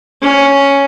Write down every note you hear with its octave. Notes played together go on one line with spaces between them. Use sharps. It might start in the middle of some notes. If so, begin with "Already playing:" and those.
C#4